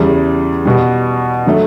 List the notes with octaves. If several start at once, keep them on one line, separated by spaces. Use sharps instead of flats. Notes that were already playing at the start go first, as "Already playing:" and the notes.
Already playing: E2 C#3 G3
B2 G3
D3 F#3 A3